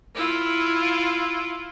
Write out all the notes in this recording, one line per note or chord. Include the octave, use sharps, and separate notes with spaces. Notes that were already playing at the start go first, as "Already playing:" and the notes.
E4 F4